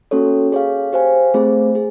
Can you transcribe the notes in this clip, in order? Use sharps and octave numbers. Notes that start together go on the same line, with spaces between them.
A#3 C#4 F#4 A4 C#5
G#4 C#5 F5
G4 C5 F5 G#5
A3 C4 F4 G#4 C5
G#4